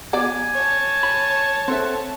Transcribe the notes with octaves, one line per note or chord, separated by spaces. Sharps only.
F#3 B3 D5 G#5
C#5 A5
B5
C4 A4 E5 F#5